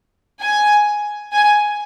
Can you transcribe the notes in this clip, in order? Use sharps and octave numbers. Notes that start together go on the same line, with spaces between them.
G#5
G#5